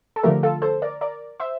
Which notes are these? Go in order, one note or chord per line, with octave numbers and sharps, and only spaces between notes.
A4
D3 F3 A3 G4 A#4
F4 A4
A4 C5
A#4 D5
A#4 D5
C5 E5